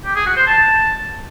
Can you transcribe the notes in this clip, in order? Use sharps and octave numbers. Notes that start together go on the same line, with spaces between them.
G4
G#4
F#4
C5
A5